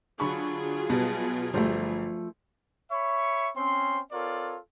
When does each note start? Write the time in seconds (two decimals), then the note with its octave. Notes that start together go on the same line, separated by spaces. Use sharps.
0.20 D3 F#3 F4 G#4 B5 C#6
0.90 B2 G3 B3
1.54 G1 F3 G3 A3
2.91 C#5 E5 B5 C#6
3.56 C4 C#4 C6
4.12 C4 F4 A4 A#4 C#5 D5